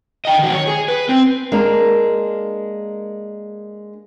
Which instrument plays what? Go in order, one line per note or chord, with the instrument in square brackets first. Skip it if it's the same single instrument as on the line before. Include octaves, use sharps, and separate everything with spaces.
[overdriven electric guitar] D#5 G5
D#3 F#4
C#5
G#4
B4
C4
[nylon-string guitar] G#3 A#3 D4 A#4